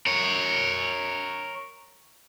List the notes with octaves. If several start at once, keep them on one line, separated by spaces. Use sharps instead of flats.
A#4 C#5